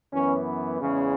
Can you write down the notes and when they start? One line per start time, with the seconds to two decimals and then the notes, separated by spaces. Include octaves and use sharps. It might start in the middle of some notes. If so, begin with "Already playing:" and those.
0.12 F#2 E3 B3 C#4
0.81 E2 C#3 E3 G#3 C#4